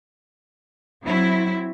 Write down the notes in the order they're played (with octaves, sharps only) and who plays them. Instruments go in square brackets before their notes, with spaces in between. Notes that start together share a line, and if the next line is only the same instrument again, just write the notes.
[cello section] F#3 C4 E4